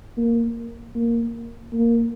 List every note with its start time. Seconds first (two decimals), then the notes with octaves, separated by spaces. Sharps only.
0.17 A#3
0.95 A#3
1.73 A#3